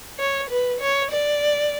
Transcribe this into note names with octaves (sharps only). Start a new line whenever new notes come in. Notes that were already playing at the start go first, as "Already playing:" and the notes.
C#5
B4
C#5
D5